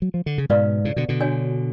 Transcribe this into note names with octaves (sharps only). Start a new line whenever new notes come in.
F#3
F3
D3
C#3
G#2 B2 B4 D5 F5
A2 C#3
B2 D3
B2 D3
D4 F#4 C#5 G#5